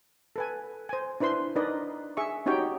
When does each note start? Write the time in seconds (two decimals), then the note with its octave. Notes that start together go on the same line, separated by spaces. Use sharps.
0.36 A4 B4 G#5
0.89 C5 G#5
1.20 D4 E4 B4 C5 C6
1.56 D4 D#4 A#4 B4 D5 D#5
2.17 G#4 E5 C#6
2.46 C#4 D#4 F#4 G4 C#5 G5